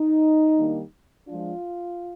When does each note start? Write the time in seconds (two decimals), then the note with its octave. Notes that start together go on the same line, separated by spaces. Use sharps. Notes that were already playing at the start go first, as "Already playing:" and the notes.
Already playing: D#4
0.55 D#3 G3 A#3 D4
1.27 F3 G#3 D4 F4